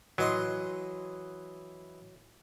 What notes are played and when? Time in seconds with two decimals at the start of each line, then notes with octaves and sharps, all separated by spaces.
0.18 E3 F#3 D#5 C6